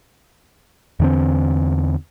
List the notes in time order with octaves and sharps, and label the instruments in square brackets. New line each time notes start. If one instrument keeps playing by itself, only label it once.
[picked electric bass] E2 D3 C4